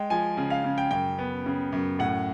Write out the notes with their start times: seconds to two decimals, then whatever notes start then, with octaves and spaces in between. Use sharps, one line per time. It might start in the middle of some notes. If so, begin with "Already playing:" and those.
Already playing: G#3 G5
0.10 F3 G#5
0.37 C#3
0.50 F5
0.64 C#3
0.78 G5
0.91 F#2 G5
1.19 B3
1.46 C#3
1.72 F#2
1.99 A2 F#5